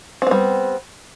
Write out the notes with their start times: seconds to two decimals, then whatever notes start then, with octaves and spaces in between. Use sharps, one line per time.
0.22 C4
0.27 B3
0.31 G3